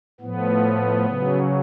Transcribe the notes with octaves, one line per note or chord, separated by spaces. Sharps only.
A2 F3 B3
C#3 F#3